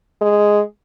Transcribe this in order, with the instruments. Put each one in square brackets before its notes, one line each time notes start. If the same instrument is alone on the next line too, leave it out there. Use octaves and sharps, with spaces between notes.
[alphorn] G#3